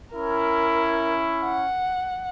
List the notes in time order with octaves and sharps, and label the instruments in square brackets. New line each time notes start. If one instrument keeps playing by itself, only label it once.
[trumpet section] C#4 E4 [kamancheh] A#4
[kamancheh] F#5